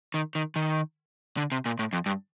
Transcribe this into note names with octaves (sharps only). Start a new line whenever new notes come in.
D#3
D#3
D#3
D3
C3
A#2
A2
F2
G2